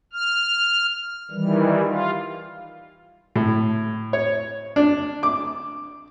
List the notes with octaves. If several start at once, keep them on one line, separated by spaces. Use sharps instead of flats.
F6
D#3 E3 G3
F4
A2
C#5
D4
D6